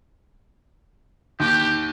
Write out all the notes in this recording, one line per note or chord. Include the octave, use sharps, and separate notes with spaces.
D#2 G4